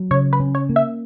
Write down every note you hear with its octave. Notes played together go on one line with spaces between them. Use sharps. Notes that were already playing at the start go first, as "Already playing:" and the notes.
Already playing: F#3
C#3 C#5
B4
C#4
C#5
A#3
E5